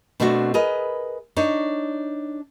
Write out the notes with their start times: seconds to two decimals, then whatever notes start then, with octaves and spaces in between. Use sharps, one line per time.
0.20 B2 A3 C4 D4 F#4
0.54 G#4 A#4 B4 D#5
1.37 D4 D#4 C#5